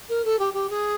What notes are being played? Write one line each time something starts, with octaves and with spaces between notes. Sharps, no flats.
A#4
A4
G4
G4
G#4